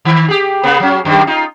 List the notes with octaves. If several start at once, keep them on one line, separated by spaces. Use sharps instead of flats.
D#3
G4 G#4
C#3 A#3 B3
F#3 C#4
F#2 D#3 G3
D#4 F4